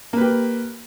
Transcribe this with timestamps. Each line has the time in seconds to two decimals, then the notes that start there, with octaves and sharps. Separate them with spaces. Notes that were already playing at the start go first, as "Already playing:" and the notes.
0.13 A#3
0.17 B4
0.21 G4